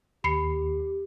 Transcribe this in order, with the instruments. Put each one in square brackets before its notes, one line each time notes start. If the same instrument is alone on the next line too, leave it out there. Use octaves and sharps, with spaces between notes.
[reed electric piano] D#2 [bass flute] G4 [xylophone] B5 C7 C#7